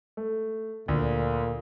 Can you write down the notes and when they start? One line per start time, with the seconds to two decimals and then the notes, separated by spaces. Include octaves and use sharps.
0.17 A3
0.88 D2 A#2